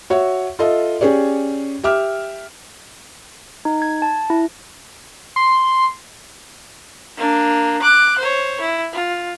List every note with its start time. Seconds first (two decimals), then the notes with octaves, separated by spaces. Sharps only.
0.10 F#4 C#5 E5
0.59 F4 A4 D#5 E5
1.01 C#4 G4 G#4 C#5 D5
1.84 G4 E5 D6 F6
3.65 D#4
3.82 G#6
4.02 A5
4.30 E4
5.36 C6
7.17 A#3 D4
7.82 D6 F#6
8.18 C5 C#5
8.61 E4
8.93 F4